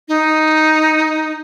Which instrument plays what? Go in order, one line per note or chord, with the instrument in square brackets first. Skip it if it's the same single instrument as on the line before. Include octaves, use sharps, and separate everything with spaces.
[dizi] D#4